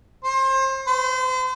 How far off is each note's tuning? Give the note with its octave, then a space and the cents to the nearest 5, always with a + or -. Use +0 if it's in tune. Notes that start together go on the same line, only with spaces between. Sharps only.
C5 +30
C5 -35